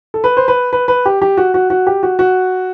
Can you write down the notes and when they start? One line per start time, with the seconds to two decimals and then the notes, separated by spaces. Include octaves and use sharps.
0.14 A4
0.24 B4
0.37 C5
0.48 B4
0.73 B4
0.88 B4
1.06 G4
1.22 G4
1.37 F#4
1.54 F#4
1.70 F#4
1.87 G4
2.03 F#4
2.19 F#4